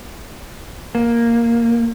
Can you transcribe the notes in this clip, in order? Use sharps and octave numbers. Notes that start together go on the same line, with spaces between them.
A#3